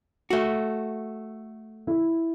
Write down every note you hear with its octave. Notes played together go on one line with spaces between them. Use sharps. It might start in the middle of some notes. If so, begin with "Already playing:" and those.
A3 F#4
E4